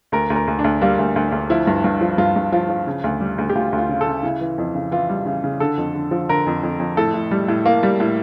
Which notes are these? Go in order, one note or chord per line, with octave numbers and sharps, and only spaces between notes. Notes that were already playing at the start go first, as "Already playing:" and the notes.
D2 A#4
D2
A#4
D2
D4
D2
G3 A#3
D2
D2
D2
F3 E4
G2
G2
F3
G2 F4
G2
F3 F4
F3
C#3
D2
G3
D2
G4
D2 F4
D2
F4
C#3
A4
C#3
C#3 E4
E3
F2
C#3
E3 F4
G3
C#3
C#3
D3 A4
F2
D3
F3
D3 A#4
F2
F2
F2
A2 A4
A2
G3
A2
A2 A#3
G3
A2